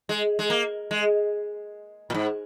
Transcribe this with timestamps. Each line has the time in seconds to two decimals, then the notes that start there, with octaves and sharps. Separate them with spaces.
0.09 G#3
0.39 G#3
0.50 A#3
0.91 G#3
2.10 A#2
2.15 G#2